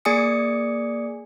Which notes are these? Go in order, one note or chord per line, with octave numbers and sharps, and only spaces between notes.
A#3 G#4 D5 G#5 D#6 C#7